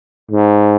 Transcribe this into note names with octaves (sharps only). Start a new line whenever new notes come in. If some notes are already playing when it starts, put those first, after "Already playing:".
G#2